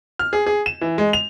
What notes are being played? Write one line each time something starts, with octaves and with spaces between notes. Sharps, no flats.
F6
G#4
G#4
E7
E3
G#3
F7